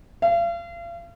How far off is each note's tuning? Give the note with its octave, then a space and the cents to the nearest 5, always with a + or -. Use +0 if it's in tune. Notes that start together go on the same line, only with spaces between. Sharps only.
F5 -40